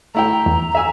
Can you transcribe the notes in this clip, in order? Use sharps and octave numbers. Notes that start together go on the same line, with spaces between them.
A3 E4 G5 A#5
E2
E5 G#5 E6